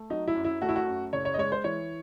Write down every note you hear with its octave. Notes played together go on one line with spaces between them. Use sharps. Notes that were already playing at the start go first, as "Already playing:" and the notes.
Already playing: A3
F#3 D#4
E4
F#2
E4
A3 F#4
E4
F#4
F#2
F#1 C#5
C#5
D#5
G#3 C#5
C5
E3 C#5